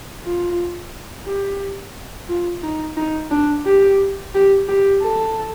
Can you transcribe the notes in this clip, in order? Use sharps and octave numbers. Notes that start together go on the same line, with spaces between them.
F4
G4
F4
D#4
D#4
D4
G4
G4
G4
A4